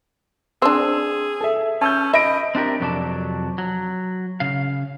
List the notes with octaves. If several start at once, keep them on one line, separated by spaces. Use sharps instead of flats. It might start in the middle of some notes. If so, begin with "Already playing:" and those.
C4 D4 G#4 E6
A4 E5
C#4 A5 E6 G6
D#5 E5 B5 A#6 D7
C4 D4 G4 A#4
F2 C3 F#3 B3 D5 A5
F#3
C#3 F5